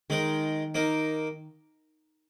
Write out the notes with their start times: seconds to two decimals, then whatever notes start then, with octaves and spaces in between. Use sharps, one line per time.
0.10 D#3 G#3 D#4 A#4
0.75 A#3 D#4 A#4